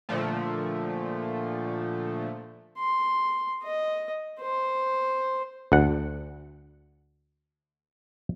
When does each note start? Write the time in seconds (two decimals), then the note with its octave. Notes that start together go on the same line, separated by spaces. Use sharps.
0.09 A#2 D3 F3 A3
2.79 C6
3.63 D#5
4.41 C5
5.72 D2 F#5